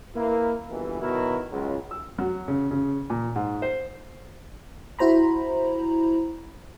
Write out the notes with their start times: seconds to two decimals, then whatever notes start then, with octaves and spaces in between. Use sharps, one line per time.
0.15 A#3 E4 B4
0.70 G1 B2 E3
1.01 B2 D#3 F#3 E4 F#4 A#4
1.50 C#2 F#3
1.91 E6
2.19 F#3
2.48 C#3
2.71 C#3
3.10 A#2
3.36 G#2
3.62 C5
4.99 E4 F#4 C5 A#5 B5